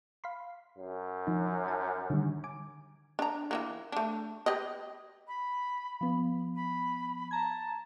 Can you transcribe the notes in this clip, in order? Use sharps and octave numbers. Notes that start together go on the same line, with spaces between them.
F5 B5 C6
F#2
F3 D#4
A5
D3 D#3 G3
G#5 D6
D4 A#5
E3 F#3 A#3
A3 D4
G4 B4 D#5
B5
F3 B3
B5
A5 A#5 G#6